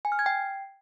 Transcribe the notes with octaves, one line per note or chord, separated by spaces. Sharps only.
G#5
F6
G#6
G5